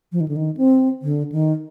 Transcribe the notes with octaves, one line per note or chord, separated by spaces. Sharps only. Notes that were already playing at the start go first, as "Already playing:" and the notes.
F3
D#3
D3
D#3
C4
D3
D#3